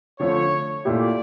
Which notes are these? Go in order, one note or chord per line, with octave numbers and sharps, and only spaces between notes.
D3 F3 A3 C#4 C#5
A#2 A3 E4 G4 D5